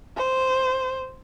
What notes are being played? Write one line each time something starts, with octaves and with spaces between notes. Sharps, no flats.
C5